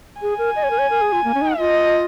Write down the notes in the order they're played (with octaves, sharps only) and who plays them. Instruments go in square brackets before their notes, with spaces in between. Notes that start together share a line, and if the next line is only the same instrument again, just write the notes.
[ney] G#4 [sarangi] G#5
[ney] A#4
D#5
C#5
A#4
C#5
A#4
G#4
F4
A#3
C#4
D#4
[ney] F4 [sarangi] D#5